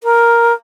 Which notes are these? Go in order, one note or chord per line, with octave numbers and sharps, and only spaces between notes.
A#4